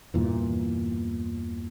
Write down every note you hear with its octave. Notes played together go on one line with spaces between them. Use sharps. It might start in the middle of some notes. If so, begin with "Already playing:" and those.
E2 G2 A#2 E3